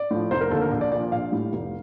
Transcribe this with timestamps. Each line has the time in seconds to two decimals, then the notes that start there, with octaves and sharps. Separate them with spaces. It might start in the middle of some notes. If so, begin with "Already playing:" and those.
Already playing: D5
0.11 A2 F3
0.31 F1 C5
0.41 A#4
0.51 D#2 D3 A4
0.61 A#4
0.71 A#1
0.81 D5
0.92 A#2 F3 D5
1.12 A#1 F5
1.32 A2 G3
1.53 F1